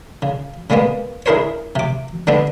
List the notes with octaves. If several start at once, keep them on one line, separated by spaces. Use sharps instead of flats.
C#3
C#3 G3 G#3 A#3 B3
D4 E4 G#4 A#4 C5 C#5
C3 D6
D3 G3 B3 C4 D4